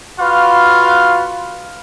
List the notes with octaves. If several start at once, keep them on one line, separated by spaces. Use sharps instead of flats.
F4 F#4 B4 F5